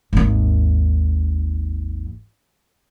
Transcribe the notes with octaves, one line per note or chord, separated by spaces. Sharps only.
G#1 D#2